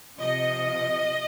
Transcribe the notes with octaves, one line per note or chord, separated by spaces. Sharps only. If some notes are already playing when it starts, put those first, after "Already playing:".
C3 F3 D#5